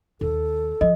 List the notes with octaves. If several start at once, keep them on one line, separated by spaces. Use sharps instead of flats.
D#2 A4
F3 D#5